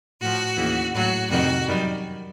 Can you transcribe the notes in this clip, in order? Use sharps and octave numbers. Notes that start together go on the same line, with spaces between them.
A2 F3 F#4
D#2 C#3 E3
A2 F#3 F#4
F2 C3 D#3 G3 F#4
F#2 D#3 G3